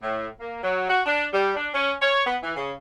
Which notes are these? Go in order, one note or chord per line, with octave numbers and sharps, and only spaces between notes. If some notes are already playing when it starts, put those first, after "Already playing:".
A2
A#3
F#3
F#4
D4
G3
D4
C#4
C#5
B3
E3
C#3